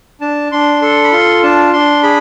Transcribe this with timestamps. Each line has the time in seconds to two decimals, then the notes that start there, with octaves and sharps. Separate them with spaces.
0.21 D4 A5
0.52 D4 C6
0.82 A4 C6
1.04 B5
1.12 F4 C6
1.43 D4 A5
1.73 D4 C6
2.03 G#4 B5